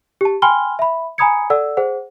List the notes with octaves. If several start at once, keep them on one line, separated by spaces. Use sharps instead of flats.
G4 A5
G5 G#5 B5 C6 F6 G7
E5 B5
G#5 A#5 B5 D#6 G#6 C#7
A4 D5 F#5 E6
G#4 C5 F#5